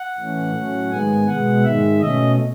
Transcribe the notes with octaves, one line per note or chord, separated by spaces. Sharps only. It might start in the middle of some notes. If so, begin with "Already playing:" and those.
Already playing: F#5
A2 E3 A3 C#4
A2 F#3 A3 C#4
G#2 D#3 G#3 B3 G#5
B2 G#3 B3 F#5
G#2 D#3 G#3 E5
B2 A3 C#4 D#5